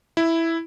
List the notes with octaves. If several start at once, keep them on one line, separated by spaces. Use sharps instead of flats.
E4